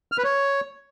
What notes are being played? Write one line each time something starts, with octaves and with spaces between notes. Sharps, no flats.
F6
B4
C#5